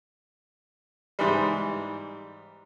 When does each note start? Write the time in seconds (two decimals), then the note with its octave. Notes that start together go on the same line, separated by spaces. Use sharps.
1.19 G#2 E3 G3